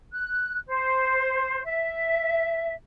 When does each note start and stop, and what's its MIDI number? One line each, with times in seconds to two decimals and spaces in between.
0.12 0.58 90
0.67 1.62 72
1.66 2.73 76